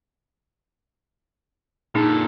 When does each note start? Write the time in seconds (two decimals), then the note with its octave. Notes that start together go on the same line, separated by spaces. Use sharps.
1.95 A#2 D4 D#4 G#4 A4